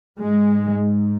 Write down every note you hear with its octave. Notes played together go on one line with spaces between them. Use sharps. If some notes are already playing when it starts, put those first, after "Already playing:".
G#2 G#3